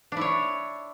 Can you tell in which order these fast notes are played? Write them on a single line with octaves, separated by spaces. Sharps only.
D4 E4 C#5